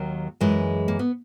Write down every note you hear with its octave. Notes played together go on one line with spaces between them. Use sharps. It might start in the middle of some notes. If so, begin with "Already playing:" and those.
Already playing: D#2 D#3 F#3
F#2 E3 G#3 G#4
A#3
B3